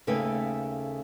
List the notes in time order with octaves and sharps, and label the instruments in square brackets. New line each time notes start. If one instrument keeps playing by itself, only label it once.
[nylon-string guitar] D#2 C#3 A3 A#3 B4 G5